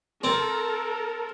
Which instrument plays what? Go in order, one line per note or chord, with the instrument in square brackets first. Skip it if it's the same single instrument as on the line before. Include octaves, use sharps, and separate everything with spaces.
[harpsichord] C4 [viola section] A4 A#4